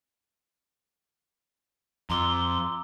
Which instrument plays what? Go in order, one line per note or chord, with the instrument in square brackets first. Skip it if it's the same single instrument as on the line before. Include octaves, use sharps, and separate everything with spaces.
[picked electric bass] F2 [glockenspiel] A#5 D6 E6 [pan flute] C6